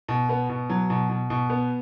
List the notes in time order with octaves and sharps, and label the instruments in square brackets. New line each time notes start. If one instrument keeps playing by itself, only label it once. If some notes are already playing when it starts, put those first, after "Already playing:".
[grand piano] B2
B3
B2
F#3
B2
B2
B2
B3